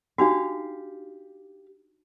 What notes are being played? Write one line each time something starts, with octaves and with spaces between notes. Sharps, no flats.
D4 D#4 F#4 G4 F5